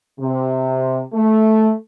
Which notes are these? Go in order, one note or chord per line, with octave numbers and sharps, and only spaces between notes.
C3
A3